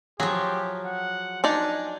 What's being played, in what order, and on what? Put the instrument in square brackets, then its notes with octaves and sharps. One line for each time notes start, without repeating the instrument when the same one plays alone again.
[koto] F3 F#3 [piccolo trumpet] G4 [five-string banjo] G#4
[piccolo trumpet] F#5
[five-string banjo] D4 D#4 D5 [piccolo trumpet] G#5